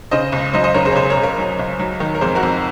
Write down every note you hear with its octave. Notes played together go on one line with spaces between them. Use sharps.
C#3 C5 D#5
C#2
F#3 C5 D#5
C5 D#5
C#3 A#4 C#5
G#4 C5
C#5
C#2 G#4 C5
A#4 C#5
C#2
A#4 C#5
F#3
C#2
F#3
D#3
A#4
F2 G#4 C5
F#4 A#4
F2